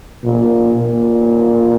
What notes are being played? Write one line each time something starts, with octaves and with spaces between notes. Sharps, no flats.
A#2
A#2